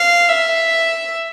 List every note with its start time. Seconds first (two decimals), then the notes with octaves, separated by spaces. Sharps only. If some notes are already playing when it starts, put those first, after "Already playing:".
Already playing: F5
0.29 E5